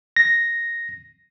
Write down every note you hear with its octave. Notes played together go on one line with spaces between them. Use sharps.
A#6